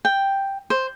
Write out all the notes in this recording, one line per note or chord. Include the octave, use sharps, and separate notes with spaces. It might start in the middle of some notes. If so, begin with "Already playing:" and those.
G5
C5